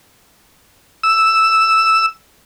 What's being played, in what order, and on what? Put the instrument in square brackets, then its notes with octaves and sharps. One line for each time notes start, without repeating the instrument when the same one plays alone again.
[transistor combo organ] E6